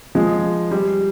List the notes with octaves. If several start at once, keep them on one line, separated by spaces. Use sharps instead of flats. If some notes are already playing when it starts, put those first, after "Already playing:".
F3 G#3
G3